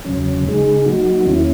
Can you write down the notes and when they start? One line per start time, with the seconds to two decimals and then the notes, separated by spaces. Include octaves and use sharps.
0.05 E2 C#3 F#3 C#4
0.45 C#3 G#3 D#4 G#4
0.85 F#3 A#3 D#4 F#4
1.26 E2 D#3 A#3 C#4 E4